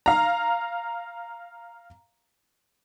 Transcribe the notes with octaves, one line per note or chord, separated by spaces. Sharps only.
F5 A#5